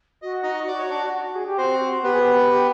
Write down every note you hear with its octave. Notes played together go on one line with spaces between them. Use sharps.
F#4 D#5
D#4 D#5
F#4 D5
C#5
D4 D5
F#4
G#4
G4
C4 F#4 C5
B3 G4 B4
G#4
G4
G4